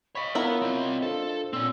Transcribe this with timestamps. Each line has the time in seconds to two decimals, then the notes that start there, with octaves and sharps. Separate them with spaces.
0.15 C#5 D#5 B5 C#6 B6
0.35 B3 E4 F4 A#4 C#5 F#5
0.62 G3 C4 D#5
1.02 D4 F4 A4 C5
1.53 A#2 C4 C#5 E6